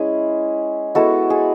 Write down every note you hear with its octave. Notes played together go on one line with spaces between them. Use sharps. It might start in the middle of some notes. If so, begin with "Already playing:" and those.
Already playing: G#3 C#4 E4 G#4
G#3 B3 E4 F#4 A4
G#4